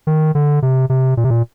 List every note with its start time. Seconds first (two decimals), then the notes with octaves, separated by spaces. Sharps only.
0.07 D#3
0.35 D3
0.62 C3
0.90 C3
1.17 A#2
1.24 C3
1.30 A#2